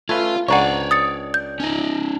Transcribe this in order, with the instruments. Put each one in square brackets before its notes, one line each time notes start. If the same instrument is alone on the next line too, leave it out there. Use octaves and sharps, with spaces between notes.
[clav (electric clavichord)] A3 C#4 B4 [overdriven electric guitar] F4 F5 [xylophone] G#6
[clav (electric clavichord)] C#2 D4 G#5 [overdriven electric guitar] C#5 D5 [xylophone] F#5 A#5 C#6
[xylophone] D#6 A6 C#7
G6
[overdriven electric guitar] C#4 D#4